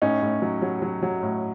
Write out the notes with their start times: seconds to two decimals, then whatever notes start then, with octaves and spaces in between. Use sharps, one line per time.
0.02 A2 C#4 D#4
0.22 A2
0.42 F#3
0.62 F#3
0.82 F#3
1.03 F#3
1.23 A2